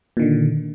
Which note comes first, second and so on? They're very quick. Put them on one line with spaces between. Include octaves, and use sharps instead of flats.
A#2 D#3 D3